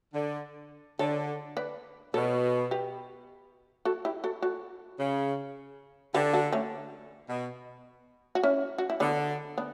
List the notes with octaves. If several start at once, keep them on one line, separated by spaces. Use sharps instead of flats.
D3
D3 A4 C#5
B4 D5
B2 A4 C#5
G4 B4
F#4 A4
E4 G4
F#4 A4
F#4 A4
C#3
D3 G4 B4
F#4 A4
A3 C#4
B2
F#4
C#4 E4
F#4
E4
D3 B3 D4
B3 D4